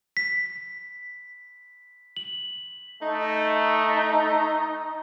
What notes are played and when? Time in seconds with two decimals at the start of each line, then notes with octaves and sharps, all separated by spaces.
0.17 B6
2.17 F#7
3.02 A3 D#4